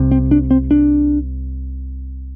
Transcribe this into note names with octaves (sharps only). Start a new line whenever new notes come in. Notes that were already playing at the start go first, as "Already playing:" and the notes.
Already playing: C2 C3
C4
D4
C4
D4